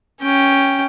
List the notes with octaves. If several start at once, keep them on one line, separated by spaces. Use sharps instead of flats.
C#4 G5